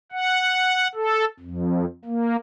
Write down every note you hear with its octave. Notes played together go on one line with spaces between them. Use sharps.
F#5
A4
F2
A#3